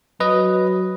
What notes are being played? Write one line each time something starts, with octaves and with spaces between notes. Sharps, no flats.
F#3 B4 D#5